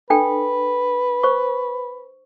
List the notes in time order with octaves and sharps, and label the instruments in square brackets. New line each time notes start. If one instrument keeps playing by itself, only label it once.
[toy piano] D4 A4 G5 [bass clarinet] B4
[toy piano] C5 C#6